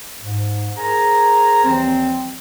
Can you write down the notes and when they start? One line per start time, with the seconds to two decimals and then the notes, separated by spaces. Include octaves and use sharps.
0.21 G#2
0.77 G#4 A#4 C5 G#5 A#5
1.64 D#2 E3 F3 G3 C4